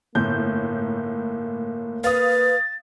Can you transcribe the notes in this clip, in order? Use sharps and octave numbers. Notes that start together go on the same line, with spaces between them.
G1 A2 A#3 G6
B4 F5 D#6 A6